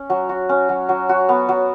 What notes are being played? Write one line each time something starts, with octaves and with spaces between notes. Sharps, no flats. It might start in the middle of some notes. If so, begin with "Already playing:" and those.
Already playing: C#4
F#3
F#4
C#4
F#3
F#3
F#4
B3
F#3